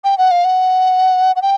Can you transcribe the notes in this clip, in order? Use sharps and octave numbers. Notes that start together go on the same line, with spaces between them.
G5
F#5
F5
F#5
F#5
G5